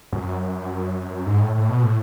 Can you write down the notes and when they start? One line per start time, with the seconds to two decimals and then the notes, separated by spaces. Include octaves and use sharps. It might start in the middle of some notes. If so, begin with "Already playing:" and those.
0.13 F#2
1.26 G#2
1.41 A2
1.55 A2
1.69 B2
1.83 A2